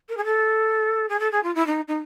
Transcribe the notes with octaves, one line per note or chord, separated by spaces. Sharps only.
A#4
G#4
A4
G#4
A4
G#4
F4
E4
D#4
D#4